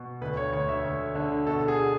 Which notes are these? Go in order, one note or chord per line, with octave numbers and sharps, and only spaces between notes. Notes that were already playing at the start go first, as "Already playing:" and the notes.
Already playing: B2
D2 B4
C#5
D2 C#5
E5
D2
D3
B2 A4
G#4